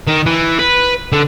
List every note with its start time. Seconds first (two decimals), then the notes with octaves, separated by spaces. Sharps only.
0.08 D#3
0.26 E3
0.59 B4
1.13 D3